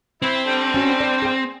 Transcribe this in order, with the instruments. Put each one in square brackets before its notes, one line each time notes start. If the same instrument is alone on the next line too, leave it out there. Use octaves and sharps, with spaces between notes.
[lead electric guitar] C4 [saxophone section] E4
[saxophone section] D3 G3
[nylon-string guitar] C#4 F#4
D5
G#4 G5